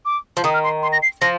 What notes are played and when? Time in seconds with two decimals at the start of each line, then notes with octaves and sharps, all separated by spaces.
0.05 D6
0.37 F3
0.44 D#3 D#6
0.54 F6
0.64 C6
0.83 C6
0.92 A#6
1.02 C7
1.21 F3 A#6